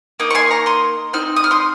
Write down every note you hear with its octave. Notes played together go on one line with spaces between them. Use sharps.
A#3 D#4 D#6
C#6
G#5 C6
A#5 C#6
C6 D#6
C4 D#4 F6
D#6
F6
C6 D#6